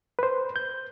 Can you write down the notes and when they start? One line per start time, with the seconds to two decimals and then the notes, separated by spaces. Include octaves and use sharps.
0.19 B4 C5
0.56 G6